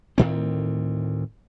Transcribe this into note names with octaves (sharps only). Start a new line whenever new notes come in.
D2 A2 D#3 C4